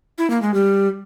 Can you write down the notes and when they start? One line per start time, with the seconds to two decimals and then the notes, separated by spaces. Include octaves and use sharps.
0.18 E4
0.30 A#3
0.42 G#3
0.54 G3